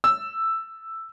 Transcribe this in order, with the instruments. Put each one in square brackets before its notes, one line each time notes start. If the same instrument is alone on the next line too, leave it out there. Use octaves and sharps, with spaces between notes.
[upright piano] E6